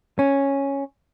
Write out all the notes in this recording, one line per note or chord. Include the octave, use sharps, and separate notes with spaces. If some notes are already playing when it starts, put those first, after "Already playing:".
C#4